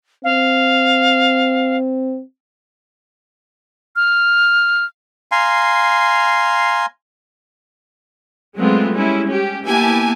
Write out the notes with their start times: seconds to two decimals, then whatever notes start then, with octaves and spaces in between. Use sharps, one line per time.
0.24 C4 F5
3.96 F6
5.32 F5 G#5 A#5 C6
8.57 F#3 G#3 A3 B3 C4 F4
8.92 G3 G#3 C#4 E4
9.28 C#4 G4
9.64 A#3 B3 E4 G4 G#5 A5